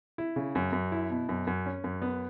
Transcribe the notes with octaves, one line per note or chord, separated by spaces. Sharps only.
E4
C#3
F#2
F#2
E4
B2
F#2
F#2
C#4
F#2
B3